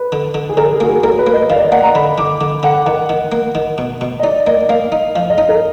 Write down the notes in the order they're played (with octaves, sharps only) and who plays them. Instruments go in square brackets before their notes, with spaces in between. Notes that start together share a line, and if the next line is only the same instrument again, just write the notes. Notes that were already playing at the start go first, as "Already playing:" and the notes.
Already playing: [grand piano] B4
[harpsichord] D3
D3
[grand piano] G#4
[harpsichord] D3 [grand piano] A#4
[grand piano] G#4
[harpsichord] A#3 [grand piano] F#4
[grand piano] G#4
[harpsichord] A#3 [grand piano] A#4
[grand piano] B4
[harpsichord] A#3
[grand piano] D#5
[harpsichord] D#3 [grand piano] F5
[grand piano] D5
D#5
[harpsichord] A#3 [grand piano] F#5
[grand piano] A#5
[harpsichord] D3 [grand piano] B5
[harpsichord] D3 [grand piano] D6
[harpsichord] D3
[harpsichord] D3 [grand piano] F#5
[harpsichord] D#3 [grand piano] F#5
[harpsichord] D#3
A#3
D#3
B2
B2
[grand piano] D#5
[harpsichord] D#4 [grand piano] D5
[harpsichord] A#3 [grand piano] D#5
[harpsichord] A#3 [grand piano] F5
[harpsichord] D#4
[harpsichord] F3 [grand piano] F5
[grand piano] D#5
[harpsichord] D#4
[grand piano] A#4